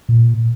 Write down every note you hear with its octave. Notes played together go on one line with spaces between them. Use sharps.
A#2